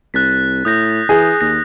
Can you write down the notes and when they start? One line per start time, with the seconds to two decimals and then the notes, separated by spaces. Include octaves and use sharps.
0.14 C2 F#6 A6 B6
0.65 A2 D#6 G6 A#6
1.09 E3 G#4
1.41 D#2 A#6